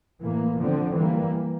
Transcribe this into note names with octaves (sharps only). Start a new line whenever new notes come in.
A2 E3 A#3
D3 F3 C4
E3 G3 A#3